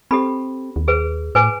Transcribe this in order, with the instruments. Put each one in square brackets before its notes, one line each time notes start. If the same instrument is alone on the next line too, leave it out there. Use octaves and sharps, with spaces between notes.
[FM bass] C4 [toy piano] G4 A4 B5
[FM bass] D#2
[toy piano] G#4 B4
[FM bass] A2 [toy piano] B4 G#5 D6